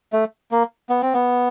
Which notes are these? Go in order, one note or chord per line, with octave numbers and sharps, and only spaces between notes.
A3
A#3
B3
C4
B3